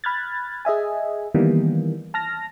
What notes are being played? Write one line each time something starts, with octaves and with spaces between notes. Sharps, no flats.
B5 F6 F#6 G#6 A6
G#4 D#5 E5 G#5
D#3 E3 G3 A#3 B3
A5 F6 A#6